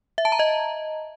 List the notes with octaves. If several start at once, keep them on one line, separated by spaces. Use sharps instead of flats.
E5
A5
A#5
D#5